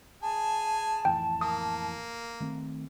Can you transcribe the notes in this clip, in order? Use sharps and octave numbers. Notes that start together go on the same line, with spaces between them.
G#4 G#5 A5
F2 A2 E3 G5
A#3 D#6
D#3 A3 C4